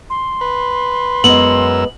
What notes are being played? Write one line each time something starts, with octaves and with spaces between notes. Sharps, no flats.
C6
B4
F#2 G#3 B3 A#4 E6 F#7